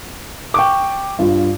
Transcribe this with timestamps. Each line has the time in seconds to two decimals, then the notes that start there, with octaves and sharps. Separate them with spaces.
0.54 G5 C#6 D6
1.19 G2 F4